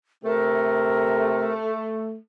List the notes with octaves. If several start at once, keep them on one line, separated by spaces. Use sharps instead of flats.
C3 A3 A#4